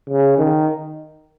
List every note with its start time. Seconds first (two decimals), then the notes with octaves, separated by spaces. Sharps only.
0.10 C#3
0.38 D#3